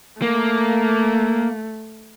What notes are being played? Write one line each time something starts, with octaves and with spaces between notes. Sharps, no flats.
A3 A#3